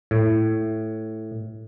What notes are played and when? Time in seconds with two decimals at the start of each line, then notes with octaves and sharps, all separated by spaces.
0.11 A2